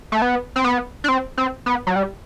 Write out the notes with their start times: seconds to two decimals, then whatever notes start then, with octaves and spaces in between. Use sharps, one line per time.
0.12 A3
0.22 B3
0.56 C4
0.64 B3
1.04 D4
1.09 C4
1.37 C4
1.66 B3
1.87 F#3
1.96 G3